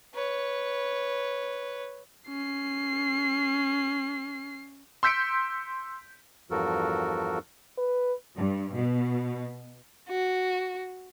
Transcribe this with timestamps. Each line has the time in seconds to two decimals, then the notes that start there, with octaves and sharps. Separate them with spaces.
0.14 B4 C#5
2.29 C#4 C7
5.03 C6 E6 G6 B6 C#7 D7
6.51 E2 G2 F3 F#4 A4 A#4
7.78 B4
8.37 G2
8.76 B2
10.09 F#4